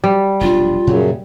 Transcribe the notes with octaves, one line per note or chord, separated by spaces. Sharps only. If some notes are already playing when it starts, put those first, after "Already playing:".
G3
F1 B1 D4 F4
F#2 A#2 C#3 F#3